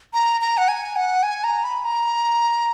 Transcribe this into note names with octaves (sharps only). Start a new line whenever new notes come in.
A#5
A#5
F#5
G#5
F#5
G#5
A#5
B5
A#5